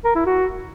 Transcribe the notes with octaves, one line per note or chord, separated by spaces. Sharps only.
A#4
E4
F#4